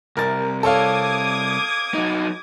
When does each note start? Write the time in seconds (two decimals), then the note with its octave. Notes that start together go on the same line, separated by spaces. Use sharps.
0.17 C2 A#4 A6
0.63 A4 C#5 F5 D6 D#6 G#6
1.94 F#3 D#4